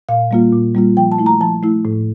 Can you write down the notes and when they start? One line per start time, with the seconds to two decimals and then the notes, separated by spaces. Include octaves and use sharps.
0.09 A#2 F5
0.31 G3 A#3 F4
0.53 A#2
0.75 G3 A#3 F4
0.97 F3 G5
1.12 A5
1.19 A3 E4
1.26 A#5
1.41 F3 A5
1.63 A3 E4
1.85 A2